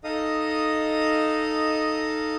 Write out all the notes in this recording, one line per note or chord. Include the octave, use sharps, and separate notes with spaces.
D#4 A4 D#5 F5 D#6